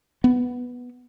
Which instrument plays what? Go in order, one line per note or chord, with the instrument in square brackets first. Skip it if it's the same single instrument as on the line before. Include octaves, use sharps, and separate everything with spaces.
[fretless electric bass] B3